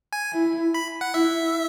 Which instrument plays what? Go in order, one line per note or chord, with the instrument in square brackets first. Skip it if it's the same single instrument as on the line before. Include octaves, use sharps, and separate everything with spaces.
[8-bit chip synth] G#5
[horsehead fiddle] E4
[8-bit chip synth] B5
F#5
[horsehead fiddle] E4 [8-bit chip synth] E5